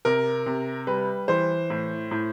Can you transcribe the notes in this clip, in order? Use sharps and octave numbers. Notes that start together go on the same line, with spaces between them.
C3 A#4
C3
G3 B4
E3 C5
A2
A2